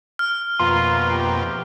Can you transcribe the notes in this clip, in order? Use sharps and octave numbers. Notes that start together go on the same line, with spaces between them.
F6
F2 B2 A#3 F4 C6
C3 C4 G4